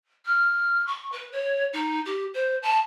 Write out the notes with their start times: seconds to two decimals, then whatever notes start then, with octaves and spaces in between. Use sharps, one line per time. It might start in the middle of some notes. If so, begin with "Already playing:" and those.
0.25 F6
0.87 C#6
1.12 B4
1.32 C#5
1.73 D#4
2.05 G4
2.34 C5
2.63 A5